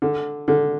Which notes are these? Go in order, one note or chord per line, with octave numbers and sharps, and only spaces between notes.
D3
D3